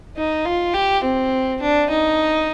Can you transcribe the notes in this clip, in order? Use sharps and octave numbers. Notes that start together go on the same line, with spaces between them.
D#4
F4
G4
C4
D4
D#4